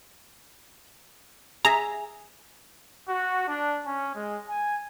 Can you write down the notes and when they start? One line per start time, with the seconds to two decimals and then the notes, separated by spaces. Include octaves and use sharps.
1.65 G#4 E5 A#5
3.09 F#4
3.48 D4
3.86 C#4
4.15 G#3
4.48 G#5